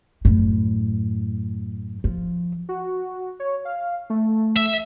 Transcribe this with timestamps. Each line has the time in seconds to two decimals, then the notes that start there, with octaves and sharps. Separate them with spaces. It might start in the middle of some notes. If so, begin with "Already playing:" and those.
0.25 F#2 A2
2.04 F3
2.69 F#4
3.40 C#5
3.65 F5
4.10 A3
4.56 E5